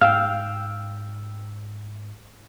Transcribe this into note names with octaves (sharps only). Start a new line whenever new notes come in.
G#2 F5 G5 E6 F6